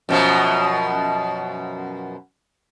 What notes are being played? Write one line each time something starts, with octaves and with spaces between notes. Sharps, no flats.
F#2 B2 F3